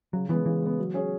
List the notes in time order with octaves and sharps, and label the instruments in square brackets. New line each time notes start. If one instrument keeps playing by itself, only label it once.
[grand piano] C#3 [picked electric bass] F#3
[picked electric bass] E3 [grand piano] G#3 B3
[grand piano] C#3 [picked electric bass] E3
[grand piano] G#3 B3
F#3
C#4 G#4 C#5